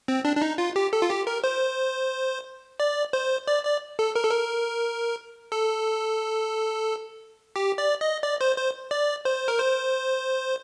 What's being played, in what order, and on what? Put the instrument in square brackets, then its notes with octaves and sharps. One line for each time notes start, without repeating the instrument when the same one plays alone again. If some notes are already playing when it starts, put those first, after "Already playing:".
[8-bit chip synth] C4
D4
D4
D#4
F4
G4
A4
F4
G4
A#4
C5
D5
C5
D5
D5
A4
A#4
A4
A#4
A4
G4
D5
D#5
D5
C5
C5
D5
C5
A#4
C5